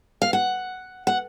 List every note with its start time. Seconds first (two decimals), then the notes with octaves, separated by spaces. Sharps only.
0.22 F5
0.33 F#5
1.07 F#5